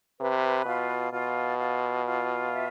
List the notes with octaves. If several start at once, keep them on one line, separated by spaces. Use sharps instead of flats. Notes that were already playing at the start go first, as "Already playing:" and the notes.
C3 B4
B2 F4
B2 F4
F4
F4
E5